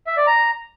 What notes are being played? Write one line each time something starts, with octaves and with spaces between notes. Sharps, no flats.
E5
D5
A#5